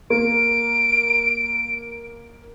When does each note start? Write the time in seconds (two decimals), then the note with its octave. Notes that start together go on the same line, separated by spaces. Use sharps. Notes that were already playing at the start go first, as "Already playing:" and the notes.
0.10 A#3 D7